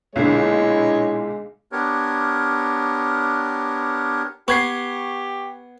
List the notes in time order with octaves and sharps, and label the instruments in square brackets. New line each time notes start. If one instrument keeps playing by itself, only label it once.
[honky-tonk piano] B1 A#2 D3 [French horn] G#3 [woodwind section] E4 [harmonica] C#5 D#5
[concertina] B3 D4 G4 A#4 C#5
[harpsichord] B3 [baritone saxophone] G4 [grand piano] C#6 G#6 C7